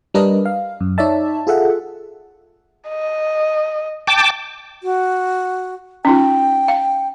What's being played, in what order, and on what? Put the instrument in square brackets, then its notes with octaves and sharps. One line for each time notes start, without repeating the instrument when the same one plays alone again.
[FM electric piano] G3 D4 A#4 B4 D#5
F5
F#2
D#4 C#5 D5 E5 A5
F4 G#4 A4 E5 F#5
[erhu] D#5
[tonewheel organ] G5 A5 D6
[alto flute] F#4
[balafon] C#4 D#4 F4 [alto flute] G5
[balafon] F5